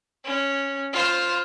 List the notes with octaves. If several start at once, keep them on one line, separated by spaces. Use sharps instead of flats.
C#4
F4 C5